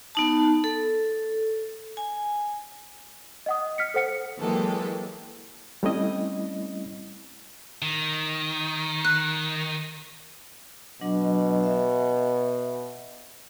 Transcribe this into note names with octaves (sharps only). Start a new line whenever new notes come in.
B3 D#4 A5
A4
G#5
D#5 F#5 D#6
F6 B6 C#7
A4 C5 F#5 C#7
E3 F#3 G#3 A#3 G4 A4
G3 A3 C4 C#4 E4 D#5
D#3
F#6
B2 F#3 D4 D#5
E5